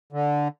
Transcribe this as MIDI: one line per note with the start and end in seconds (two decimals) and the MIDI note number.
0.13 0.48 50